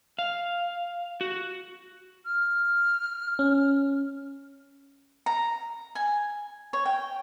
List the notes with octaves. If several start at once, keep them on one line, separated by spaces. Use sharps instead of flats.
F5
F#4
F6
C#4
A#5
G#5
C#5
G5